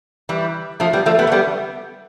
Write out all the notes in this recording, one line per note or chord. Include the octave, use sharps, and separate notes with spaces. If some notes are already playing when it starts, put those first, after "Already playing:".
E3 G3
F3 A3
G3 B3
F3 A3
G3 B3
A3
G3 B3